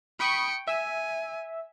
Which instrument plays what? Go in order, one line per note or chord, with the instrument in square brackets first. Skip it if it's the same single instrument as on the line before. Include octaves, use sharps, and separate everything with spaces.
[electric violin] G5 C#7 [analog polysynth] B5 C#6 D#6
[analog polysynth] E5 [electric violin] G#5